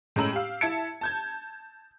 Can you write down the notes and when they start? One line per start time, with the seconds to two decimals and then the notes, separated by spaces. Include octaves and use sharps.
0.16 A2 G#3 C#4 A#5 E6 F#7
0.33 G4 F5
0.61 E4 E5 A5 G#6 C#7
1.01 A5 G6 G#6